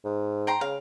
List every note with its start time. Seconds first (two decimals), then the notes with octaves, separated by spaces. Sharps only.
0.05 G#2
0.47 G5 A#5 C6
0.61 C#3 F5